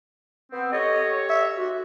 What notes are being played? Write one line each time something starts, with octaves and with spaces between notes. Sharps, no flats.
B3 C4
G4 A4 C#5 D#5
E5
F#4